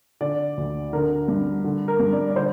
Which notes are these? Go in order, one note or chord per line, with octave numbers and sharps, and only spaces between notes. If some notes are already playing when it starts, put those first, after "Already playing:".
D3 D5
D2
D3 A#4
G2
D3
A#4
G2
D5
D5
D3 C5